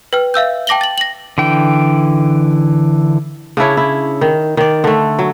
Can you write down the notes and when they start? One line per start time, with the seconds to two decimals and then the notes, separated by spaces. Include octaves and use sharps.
0.13 B4 G5 F6
0.34 E5 F5 E6 G6
0.67 G5 A5 D6 A#6 F#7 G7
0.81 A6 F#7
0.98 A#6 F#7
1.38 D3 E3 G5
3.57 C#3 D4 E4 C#5
3.77 E4
4.21 D#3
4.57 D#3 D5
4.84 D3 A3
5.19 F#3